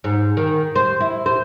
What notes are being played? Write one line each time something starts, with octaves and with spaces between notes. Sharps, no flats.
G#2
D#3
C5
E4
C5